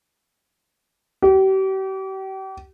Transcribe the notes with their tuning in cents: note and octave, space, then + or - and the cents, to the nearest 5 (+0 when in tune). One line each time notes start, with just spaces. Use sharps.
G4 -40